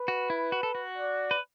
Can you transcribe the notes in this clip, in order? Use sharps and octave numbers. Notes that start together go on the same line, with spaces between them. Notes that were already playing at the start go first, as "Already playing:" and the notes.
Already playing: B4
F#4
E4
F#4
A4
F#4
D5
B4